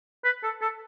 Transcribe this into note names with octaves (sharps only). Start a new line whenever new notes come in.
B4
A4
A4